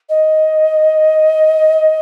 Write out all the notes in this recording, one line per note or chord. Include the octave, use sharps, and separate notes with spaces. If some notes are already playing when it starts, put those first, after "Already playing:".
D#5